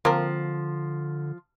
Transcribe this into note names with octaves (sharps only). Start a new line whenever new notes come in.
D3 F3 A#3 C4 A#4